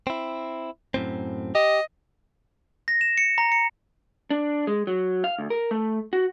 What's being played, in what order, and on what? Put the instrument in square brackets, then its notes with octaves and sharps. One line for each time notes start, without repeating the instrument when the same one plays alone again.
[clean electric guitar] C4 E4
F#2 A2 C4
[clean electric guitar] G4 [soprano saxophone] D#5
[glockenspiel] A#6
E7
C#7
A#5
C#7
[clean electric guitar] D4
G#3
F#3
F5
D2
A#4
A3
F#4